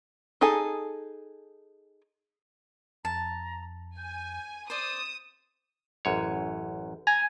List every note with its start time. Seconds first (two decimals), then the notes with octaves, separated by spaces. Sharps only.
0.41 D#4 G#4 A4 G#5
3.05 F2 A5 A#5
3.98 G#5 G6
4.70 C5 D5 D#6 E7
6.05 A1 F#2 C#5
7.07 G#5 A#5